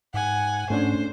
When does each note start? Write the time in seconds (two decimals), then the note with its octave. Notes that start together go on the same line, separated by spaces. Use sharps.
0.14 G#2 F#5 G#5
0.70 G#2 A3 C#4 D4 C5